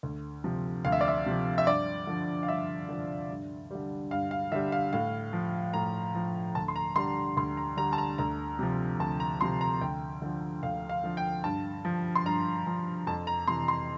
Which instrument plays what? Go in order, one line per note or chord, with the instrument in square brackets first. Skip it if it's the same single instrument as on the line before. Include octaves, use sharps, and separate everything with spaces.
[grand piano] D2
C3 F3
D2 F5
E5
D5
E5
C3 F3
E5
G2 D5
D3 F3
F5
G2 E5
D3 F3
G2
D3 G3
G2 F5
F5
D3 G3 E5
F5
A2 F5
F3
A2 A#5
F3
D2 A5
C6
A#5
D3 G3 C6
D2 C6
A#5
D3 G3 A#5
A5
A#5
D2 A#5
C3 F3
D2 A5
A#5
C3 F3 C6
A#5
D2 G5
D3 F3
D2 F5
F5
D3 F3
G5
G2 A5
F3
C6
G2 A#5
F3
F2 A5
A#5
C3 E3 C6
C6